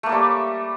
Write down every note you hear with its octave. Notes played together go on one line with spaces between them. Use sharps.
G3 A3 A#3 A4